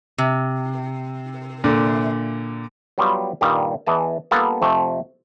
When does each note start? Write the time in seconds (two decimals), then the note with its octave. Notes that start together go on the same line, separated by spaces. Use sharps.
0.18 C3
1.64 A#2 D3
2.98 F#3 G3 B3 F4 G4
3.41 G2 A#2 D#3 G3
3.87 E2 E3 D#5 A5
4.31 G3 A#3 B3 D4 F4 A4
4.62 F2 C3 A3 C4